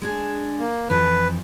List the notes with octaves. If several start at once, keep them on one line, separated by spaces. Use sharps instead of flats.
G#3 D4 G#4
A#3
F2 E3 F3 B4